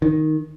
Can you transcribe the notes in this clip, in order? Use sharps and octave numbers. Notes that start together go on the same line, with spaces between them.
D#3